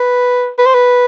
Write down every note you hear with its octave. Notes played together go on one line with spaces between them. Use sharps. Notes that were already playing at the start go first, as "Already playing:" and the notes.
Already playing: B4
B4
C5
B4